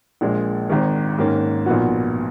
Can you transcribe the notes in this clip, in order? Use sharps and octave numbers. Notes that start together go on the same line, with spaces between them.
A#1 A#2 G#3
G#1 G#2 D#3
G#2 D#3 A#3 C#4
B1 A#2 F3 B3 F#4